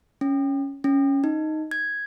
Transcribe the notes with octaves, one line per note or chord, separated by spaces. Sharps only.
C#4
C#4
D#4
G#6